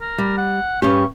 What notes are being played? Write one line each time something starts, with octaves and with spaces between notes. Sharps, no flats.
A#4
G3
F#5
G2 C#4 G4 C#6